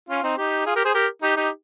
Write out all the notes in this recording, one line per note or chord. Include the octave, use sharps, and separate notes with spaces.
C#4 F4
C4 D#4
D#4 G4
F4 G#4
G4 A#4
G#4 C5
G4 A#4
D#4 G4
D#4 G4